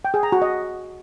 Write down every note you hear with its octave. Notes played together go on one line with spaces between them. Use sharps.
G5
G#4
A#5
F#4
D#5